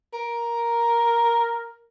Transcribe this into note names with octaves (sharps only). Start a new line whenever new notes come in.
A#4